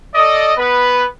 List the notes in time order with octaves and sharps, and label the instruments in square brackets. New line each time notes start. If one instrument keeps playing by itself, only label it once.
[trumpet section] A4 D5 D#5
B3 B4